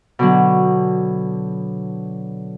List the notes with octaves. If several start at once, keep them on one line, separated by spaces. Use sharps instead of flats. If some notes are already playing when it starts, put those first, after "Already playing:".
B2 D3 F#3